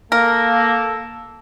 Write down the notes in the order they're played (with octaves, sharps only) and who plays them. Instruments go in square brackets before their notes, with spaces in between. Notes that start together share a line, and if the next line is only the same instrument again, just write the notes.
[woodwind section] A#3 [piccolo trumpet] A4 [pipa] A#4